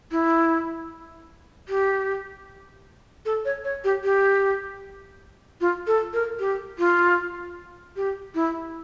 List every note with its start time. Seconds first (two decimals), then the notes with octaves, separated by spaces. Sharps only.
0.12 E4
1.69 G4
3.25 A4
3.45 C#5
3.64 C#5
3.84 G4
4.04 G4
5.61 F4
5.87 A4
6.13 A#4
6.39 G4
6.78 F4
7.96 G4
8.35 E4